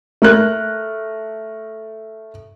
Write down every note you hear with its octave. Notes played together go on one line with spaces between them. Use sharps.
A3 A#4 F#6